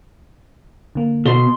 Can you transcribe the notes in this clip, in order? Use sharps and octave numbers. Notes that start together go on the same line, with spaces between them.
D3 A#3
B2 C6